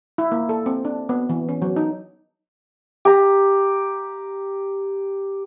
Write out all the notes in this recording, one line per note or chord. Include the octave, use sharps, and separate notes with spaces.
E4
A#3
A4
C4
D4
B3
E3
C#4
F#3
D#4
G4 A#5